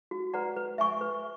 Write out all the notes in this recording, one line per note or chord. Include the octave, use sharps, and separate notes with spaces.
F#4
B4 D5 F#5 A#5
B4
E5 G#5 C#6
B4